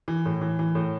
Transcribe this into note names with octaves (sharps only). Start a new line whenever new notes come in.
E3
A2
E3
E3
A2